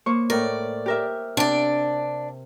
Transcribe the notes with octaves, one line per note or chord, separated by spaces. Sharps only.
A#3 C5 C#6
A2 A#4 D5
G4 A#4 E5
C3 D4 D5